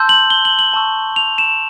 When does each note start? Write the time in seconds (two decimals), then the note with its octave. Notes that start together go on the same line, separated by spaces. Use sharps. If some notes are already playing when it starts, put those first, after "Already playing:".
Already playing: A5 C6 E6 G6
0.09 F#7
0.30 G7
0.45 F#7
0.59 F#7
0.74 A5 C#6 E6
1.16 F7
1.38 E7